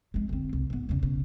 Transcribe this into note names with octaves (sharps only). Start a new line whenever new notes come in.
F2 G#3
D3 C4
C2
G#2 B3
E2 C#3
B1 C#3